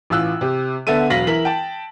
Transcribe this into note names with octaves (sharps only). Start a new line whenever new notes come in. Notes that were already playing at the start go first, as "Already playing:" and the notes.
A1 E3 F4 E6 F#6
C3 G4
D3 B3 A4 E5 D#7
E1 F#3 F5 A#6 B6 F#7
E3 E4 A#4 B6 F#7
G5 A5